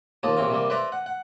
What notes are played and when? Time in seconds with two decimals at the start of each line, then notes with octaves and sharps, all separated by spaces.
0.23 D#2 F3 A#3 A5 D#6
0.37 A#1 C3 E3 C4 F5
0.50 C3 G3 A#3
0.70 B4 C5 D5 E5 A#5
0.92 F#5
1.06 F#5